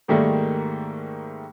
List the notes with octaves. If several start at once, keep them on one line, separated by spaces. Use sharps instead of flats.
G#2 D#3 G3 A3 A#3